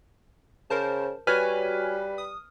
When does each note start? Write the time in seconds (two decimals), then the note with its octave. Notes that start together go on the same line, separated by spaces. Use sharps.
0.70 C#3 A#4 C5 A5
1.27 G3 F#4 B4 C#5 G#5 F6
2.18 D#6